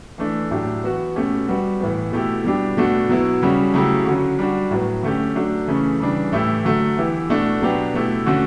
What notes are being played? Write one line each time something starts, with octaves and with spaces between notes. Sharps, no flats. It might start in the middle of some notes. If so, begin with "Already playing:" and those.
E3 A3 D4
A2 F#3 A3 D4 G4
E3 B3 F#4
B2 A3 C#4 G4
G3 B3 F#4
A2 E3 B3
B2 A3 E4 G4
B2 G3 D4 G4
B2 A3 D4 F#4
B2 F#3 B3 E4
C#3 G3 C#4 F#4
C#3 F#3 A3 E4 G4
D3 F#3 C#4
G3 D4 F#4
A2 F#3 B3
D3 A3 C#4 G4
F#3 A3 D4
C#3 E3 A3 C#4
C#3 E3 G3 D4
A2 E3 A3 E4 G4
D3 F#3 A3
E3 B3 E4 G4
B2 A3 D4 F#4
B2 F#3 B3 D4 G4
B2 A3 E4 G4
D3 A3 C#4 F#4